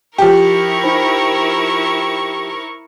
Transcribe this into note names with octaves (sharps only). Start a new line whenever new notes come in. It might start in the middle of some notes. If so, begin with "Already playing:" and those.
F3 E4 G4 A#4 C#6
D#4 C5 B5